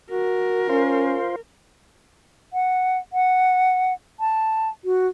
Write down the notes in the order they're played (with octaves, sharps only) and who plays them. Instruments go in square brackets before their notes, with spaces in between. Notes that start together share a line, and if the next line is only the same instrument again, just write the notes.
[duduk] F#4 [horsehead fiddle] A#4
[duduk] C#4 [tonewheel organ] F4 C5
[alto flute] F#5
F#5
A5
F#4